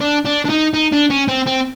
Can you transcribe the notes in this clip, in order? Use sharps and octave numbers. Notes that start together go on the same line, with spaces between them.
D4
D4
D4
D#4
D#4
D4
C#4
C4
C4